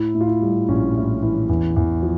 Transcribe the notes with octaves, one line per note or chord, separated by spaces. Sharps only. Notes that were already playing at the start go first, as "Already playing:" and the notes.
Already playing: A2 E4
A2
F4
E4
G3
A#1 C#4
A2
E3
E2
E2
F3